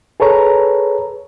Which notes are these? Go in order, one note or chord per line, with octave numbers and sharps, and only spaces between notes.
G#4 A4 B4 C#5 A#5